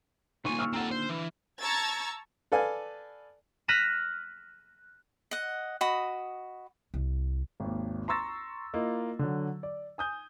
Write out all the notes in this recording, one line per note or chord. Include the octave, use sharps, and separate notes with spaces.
C2 A#2 D#3 G#5 C6 C#6
C#6 E6 F6
C4 A4 F#5 A#5
D3 C5
E3
A5 A#5 C#6 E6 G#6 A6
A4 B4 D5 F5 G#5
F6 F#6 A#6 B6 D#7 E7
D#5 F#5
F#4 D#5 B5 D#6
C2
G#1 D#2
A#5 C6 C#6 E6 A6 A#6
A#3 E4 F4 D#5
D3 F#3
D5
G#5 D#6 G6